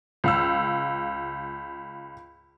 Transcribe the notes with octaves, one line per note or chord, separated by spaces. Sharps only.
C#2 F5 E6